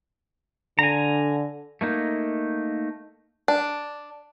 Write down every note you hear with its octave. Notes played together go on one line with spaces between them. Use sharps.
D3 G#5 A#5
A3 A#3 D#4
D4